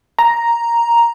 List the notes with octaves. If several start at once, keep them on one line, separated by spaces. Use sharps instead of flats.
A#5